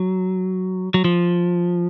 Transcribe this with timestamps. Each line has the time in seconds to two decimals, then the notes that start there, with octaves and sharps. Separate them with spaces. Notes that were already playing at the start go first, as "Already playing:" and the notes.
Already playing: F#3
0.94 F#3
1.04 F3